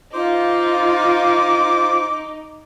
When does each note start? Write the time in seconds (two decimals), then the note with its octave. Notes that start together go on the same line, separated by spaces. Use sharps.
0.14 D#4 F4 C5 D6